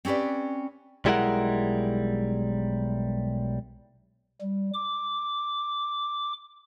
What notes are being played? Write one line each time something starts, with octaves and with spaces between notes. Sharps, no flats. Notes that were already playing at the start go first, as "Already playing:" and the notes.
C4 C#4 G4 B4 D5
B1 G3 G#3 E4 A#4 F#5
G3
D6